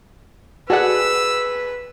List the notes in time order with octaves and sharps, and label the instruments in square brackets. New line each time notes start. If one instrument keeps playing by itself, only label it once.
[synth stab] F#4 F#5 [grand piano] G#4 A4 D5 [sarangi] B4 [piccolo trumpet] E6